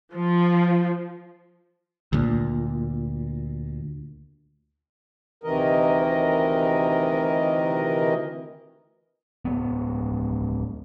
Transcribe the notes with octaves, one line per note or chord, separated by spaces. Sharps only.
F3
D2 A#2
D2 C3 D#3 E3 A#4 D#5
D1 F2 B3